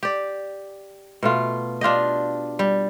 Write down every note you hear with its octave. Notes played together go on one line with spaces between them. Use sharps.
G4 D5
B2 A3 F4
D4 F4 G4 D#5
G3